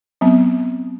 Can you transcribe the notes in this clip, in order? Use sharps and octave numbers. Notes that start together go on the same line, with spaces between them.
F#3 B3 C4